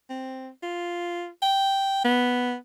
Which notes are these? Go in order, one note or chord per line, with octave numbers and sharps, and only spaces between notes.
C4
F4
G5
B3